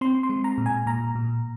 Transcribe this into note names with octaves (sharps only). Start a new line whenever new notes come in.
C4 C6
C6
G#3
A#5
A#2
G#5
A#2 A#5
A#2